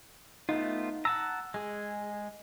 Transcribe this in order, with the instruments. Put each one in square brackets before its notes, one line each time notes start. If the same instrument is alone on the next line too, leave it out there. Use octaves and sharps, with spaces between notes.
[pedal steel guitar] A3 B3 F4 [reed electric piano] D#4
[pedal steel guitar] F#5 A5 A#5 [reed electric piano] E6
[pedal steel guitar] G#3 G#4